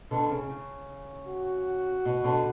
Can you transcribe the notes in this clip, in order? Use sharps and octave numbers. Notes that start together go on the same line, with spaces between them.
B2 D3
C#3
C#3
F#4
B2
B2 D3